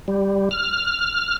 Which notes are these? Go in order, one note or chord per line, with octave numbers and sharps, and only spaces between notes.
G3
F6